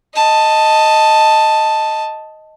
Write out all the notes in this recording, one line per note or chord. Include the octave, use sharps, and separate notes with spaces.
D#5 A5